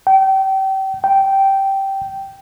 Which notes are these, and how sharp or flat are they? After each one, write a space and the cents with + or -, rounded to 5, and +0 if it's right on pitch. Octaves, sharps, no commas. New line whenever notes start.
G5 -30
G5 -10